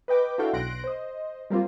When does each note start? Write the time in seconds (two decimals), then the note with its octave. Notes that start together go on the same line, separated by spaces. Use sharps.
0.08 B4 D#5 G5 D6
0.38 D4 E4 F#4 A4 F5 G5
0.53 B1 C6 F#6 A#6 D7
0.84 C5 D#5
1.50 G3 A#3 C4 F4